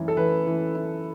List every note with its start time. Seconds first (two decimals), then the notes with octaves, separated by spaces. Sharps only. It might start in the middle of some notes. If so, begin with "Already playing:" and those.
Already playing: F#2 E3
0.08 A4
0.17 E3 B4
0.47 E3
0.75 E4